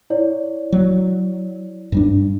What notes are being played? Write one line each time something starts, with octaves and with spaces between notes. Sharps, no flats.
E4 C#5 D5
F#3
G2 G3 D4